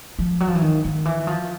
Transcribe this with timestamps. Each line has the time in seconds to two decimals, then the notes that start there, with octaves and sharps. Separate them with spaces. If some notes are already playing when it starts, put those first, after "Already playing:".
0.19 F3
0.40 F#3
0.48 F3
0.55 E3
0.62 D#3
0.84 D#3
1.05 E3
1.27 F3